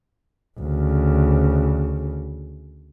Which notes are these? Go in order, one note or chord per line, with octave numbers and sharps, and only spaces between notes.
D2 C#3